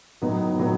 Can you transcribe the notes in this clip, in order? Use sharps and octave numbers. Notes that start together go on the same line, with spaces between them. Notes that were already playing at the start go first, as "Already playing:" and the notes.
A2 F#3 B3 D#4
A2 F#3 B3 D#4